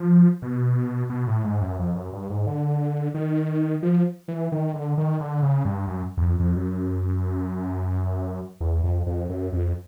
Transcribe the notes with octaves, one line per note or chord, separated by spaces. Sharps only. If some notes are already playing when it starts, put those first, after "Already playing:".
Already playing: F3
B2
B2
A2
G#2
F#2
F2
F#2
G2
G#2
D3
D#3
F3
E3
D#3
D3
D#3
D3
C#3
G2
F#2
E2
F2
F2
F#2
E2
F2
F2
F#2
F2